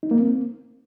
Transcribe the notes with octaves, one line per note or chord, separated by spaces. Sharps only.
D#4
A#3
C4